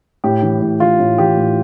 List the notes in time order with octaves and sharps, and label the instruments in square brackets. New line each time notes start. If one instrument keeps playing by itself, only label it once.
[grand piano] A2 G4
E3
A2
E3 F4
A2
E3 G4
A2